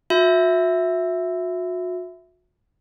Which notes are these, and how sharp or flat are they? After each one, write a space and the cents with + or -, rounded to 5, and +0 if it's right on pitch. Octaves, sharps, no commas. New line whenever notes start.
F#4 -40 E5 +0